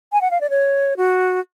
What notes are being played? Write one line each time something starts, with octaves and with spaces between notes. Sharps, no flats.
G#5
F#5
F5
D5
C#5
F#4